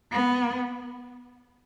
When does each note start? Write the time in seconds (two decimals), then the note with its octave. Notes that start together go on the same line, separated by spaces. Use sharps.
0.12 B3